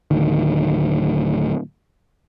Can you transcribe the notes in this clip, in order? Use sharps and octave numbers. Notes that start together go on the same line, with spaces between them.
D1 D2 D#3